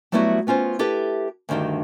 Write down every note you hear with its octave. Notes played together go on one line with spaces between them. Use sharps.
F#3 G3 A3 B3 E4 F#4
B3 C#4 F4 C5
E4 G4 A4 B4 E5
D2 G2 D#3 D4 D#4